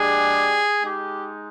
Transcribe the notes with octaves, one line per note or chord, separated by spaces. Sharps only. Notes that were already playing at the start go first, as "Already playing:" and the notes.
Already playing: G#3 D4 G4 G#4
G#3 D#4 G4